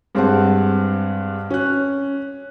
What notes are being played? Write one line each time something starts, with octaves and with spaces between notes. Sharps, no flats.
G2 G#3 C4 C5 F#5 A5
C#4 F#6